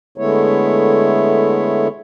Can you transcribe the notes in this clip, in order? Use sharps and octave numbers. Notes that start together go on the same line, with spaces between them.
D3 G#3 A3 B3 E4 C#5